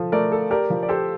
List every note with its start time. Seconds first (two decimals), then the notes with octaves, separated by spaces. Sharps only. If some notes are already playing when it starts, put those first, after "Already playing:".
Already playing: F3 A4
0.12 A3 A#4 D5
0.32 A4
0.50 G4 A#4 D5
0.70 F3
0.83 D5
0.89 G4 A4 C5